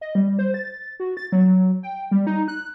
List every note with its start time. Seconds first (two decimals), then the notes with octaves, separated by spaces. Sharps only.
0.01 D#5
0.15 G3
0.39 C5
0.54 A6
1.00 F#4
1.17 A6
1.32 F#3
1.83 G5
2.11 G3
2.27 D#4
2.48 F#6